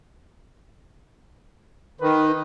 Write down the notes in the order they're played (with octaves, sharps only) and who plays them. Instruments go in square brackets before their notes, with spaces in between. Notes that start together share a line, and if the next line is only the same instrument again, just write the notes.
[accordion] D#3 [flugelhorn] B4